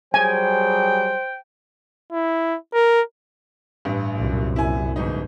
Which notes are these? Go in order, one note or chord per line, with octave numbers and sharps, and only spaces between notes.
F#3 G3 G#4 C5 G5 G#5
E4
A#4
A1 G2
C2 F#2 A#2
E4 G#5
G1 G#2 D#4